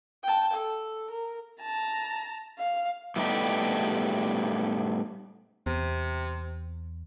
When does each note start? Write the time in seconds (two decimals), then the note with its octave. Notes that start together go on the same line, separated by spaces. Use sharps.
0.23 G5 A5
0.54 A4
1.11 A#4
1.61 A5 A#5
2.59 F5
3.16 A2 G3 A3 B3 D#4 G4
5.66 E2 C3